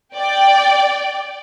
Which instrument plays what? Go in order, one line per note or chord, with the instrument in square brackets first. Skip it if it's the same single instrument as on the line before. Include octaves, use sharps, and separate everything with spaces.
[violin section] D5 G5